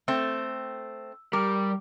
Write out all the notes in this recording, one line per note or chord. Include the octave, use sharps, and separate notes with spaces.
A3 C4 E6
G3 A#4 D6